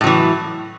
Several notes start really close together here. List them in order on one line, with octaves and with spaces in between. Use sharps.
A2 F#3 E3